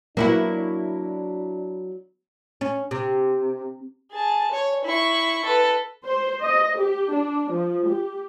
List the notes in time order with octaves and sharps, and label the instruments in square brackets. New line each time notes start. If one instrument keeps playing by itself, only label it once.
[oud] F#3 E4 F#4 [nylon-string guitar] A#3 [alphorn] D4
[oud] C#4
C3
[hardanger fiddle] G#4 A5
C#5
E4 C#6
A4 B4
[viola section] C5
D#5
G4
D4
F3
G4